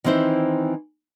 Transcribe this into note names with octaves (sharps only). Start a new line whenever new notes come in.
D#3 E3 C4 E4 C5